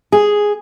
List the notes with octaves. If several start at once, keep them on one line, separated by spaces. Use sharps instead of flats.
G#4